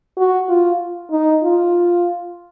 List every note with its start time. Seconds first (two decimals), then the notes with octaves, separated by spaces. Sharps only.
0.17 F#4
0.48 F4
1.11 D#4
1.43 F4